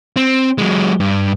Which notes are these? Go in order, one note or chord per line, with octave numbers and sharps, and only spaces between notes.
C4
F#3 G#3
G2